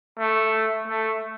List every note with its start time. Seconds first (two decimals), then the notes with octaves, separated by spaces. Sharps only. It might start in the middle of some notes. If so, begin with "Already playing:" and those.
0.19 A3
0.88 A3